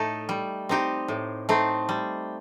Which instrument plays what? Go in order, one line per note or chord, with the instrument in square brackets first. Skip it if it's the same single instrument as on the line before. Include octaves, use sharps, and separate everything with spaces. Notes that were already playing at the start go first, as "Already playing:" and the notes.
Already playing: [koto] A2 A3 D#4 A4
G3
C4 D#4 G4
A2
A3 C4 D#4
G3